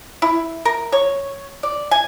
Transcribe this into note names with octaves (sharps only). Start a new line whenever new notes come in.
E4
A#4
C#5
D5
G#5